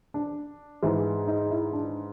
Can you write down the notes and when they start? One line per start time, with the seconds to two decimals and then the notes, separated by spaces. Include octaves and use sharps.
0.14 D4
0.83 G#2 E3
1.27 D#4
1.50 E4
1.73 D4